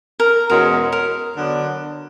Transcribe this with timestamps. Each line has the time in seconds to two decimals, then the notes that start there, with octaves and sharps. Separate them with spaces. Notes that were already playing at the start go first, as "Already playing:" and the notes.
0.20 A#4
0.49 E2 B2 G#3 C#4 F#4 A#4
0.92 A#4
1.36 D3 F#3 B3 D4